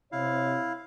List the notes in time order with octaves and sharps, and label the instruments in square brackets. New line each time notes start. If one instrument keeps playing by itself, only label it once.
[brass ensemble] C3 C#5 [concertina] E4 F5